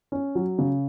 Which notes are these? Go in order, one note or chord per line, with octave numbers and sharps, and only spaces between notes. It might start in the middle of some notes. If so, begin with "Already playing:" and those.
C#4
F#3
C#3